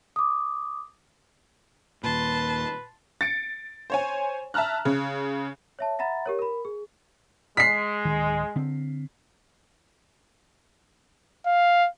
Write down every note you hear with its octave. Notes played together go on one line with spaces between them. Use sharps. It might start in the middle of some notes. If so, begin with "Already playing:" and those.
D6 D#6
D#2 A#2 B4 A5 C6
A6 C#7 D7
C5 C#5 G#5
E5 A5 A#5 F6 F#6
C#3
C#5 E5 A5
E5 F#5 A#5 B5 A6
G4 A#4 C#5
A#4 B5
G#4
G#3 B6 C7
D1 D#3
D3 C4
F5